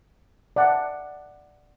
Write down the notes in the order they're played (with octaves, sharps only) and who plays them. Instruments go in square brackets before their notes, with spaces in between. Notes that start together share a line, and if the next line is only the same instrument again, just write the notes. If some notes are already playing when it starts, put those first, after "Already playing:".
[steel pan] D5 E5 F#5 A5